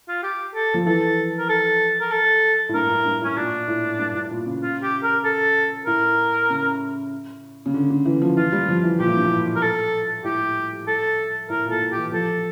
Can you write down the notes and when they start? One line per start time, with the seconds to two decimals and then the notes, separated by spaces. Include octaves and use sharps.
0.08 F4
0.23 G4
0.55 A4
0.74 F3
0.86 E3 A4
1.39 A#4
1.49 A4
2.01 A#4
2.11 A4
2.69 A2
2.74 G2 A#4
2.90 A2
3.05 G2
3.21 A2
3.24 C#4
3.37 A#2 D4
3.68 A2
3.99 G2
4.15 A2
4.31 A#2
4.46 C#3
4.62 F4
4.82 G4
5.03 A#4
5.24 A4
5.86 A2 A#4
6.50 C#3
7.66 C#3
7.74 D3
7.90 D3
8.06 E3
8.22 F3
8.37 E3 F4
8.52 G3
8.68 F3
8.84 E3
9.00 A#2 G4
9.08 A2
9.17 G2
9.25 A2
9.56 A#4
9.63 A4
10.24 A2 G4
10.87 A4
11.50 A2 A#4
11.65 A#2
11.70 A4
11.82 A2
11.92 E3 G4
12.12 F3 A4